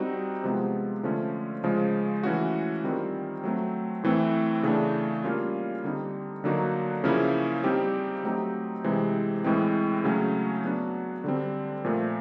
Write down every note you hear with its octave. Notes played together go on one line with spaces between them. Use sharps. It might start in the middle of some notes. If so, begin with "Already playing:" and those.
Already playing: G3 C4 D#4 F#4
C3 F3 G#3 B3
D3 F3 A3 C#4
C#3 F3 G#3
E3 A3 C#4 F#4
D#3 G3 C4 F4
F#3 A3 C4
A2 E3 A3 C4 E4
C#3 E3 A3 D4
G3 A#3 C#4 F4
D3 G3 C4 D#4
D3 F#3 A#3 D#4 F#4
C#3 F3 A#3 C#4 E4
G3 C4 D#4 G4
F#3 A3 C4 D#4 G4
C3 E3 G#3 C4
A2 E3 G#3 C4
C#3 F#3 A3 C#4
F#3 B3 D4 F#4
D3 G3 C4
A#2 F3 A3